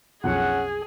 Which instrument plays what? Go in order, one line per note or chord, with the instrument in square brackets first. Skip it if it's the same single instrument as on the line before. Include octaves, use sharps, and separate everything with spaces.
[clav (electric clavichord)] B1 F2 [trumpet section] C#4 F#5 [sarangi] G#4